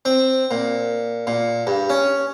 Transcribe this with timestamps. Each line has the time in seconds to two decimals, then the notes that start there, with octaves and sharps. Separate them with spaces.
0.05 C4
0.51 A#2
1.27 A#2
1.67 G2
1.90 C#4